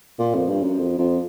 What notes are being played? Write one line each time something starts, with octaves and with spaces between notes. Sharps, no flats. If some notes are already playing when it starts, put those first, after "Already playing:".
A#2
F2
G2
F#2
F2
F2